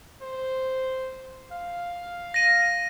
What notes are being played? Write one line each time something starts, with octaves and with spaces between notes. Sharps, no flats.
C5
F5
A#6 D#7